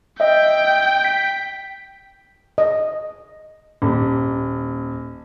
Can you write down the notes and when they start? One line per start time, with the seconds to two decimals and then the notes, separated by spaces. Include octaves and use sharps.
0.20 D#5 E5 G5
1.05 B6
2.58 D#5
3.82 D#1